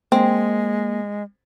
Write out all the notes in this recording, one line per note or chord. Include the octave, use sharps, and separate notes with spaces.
G#3 A#3 C4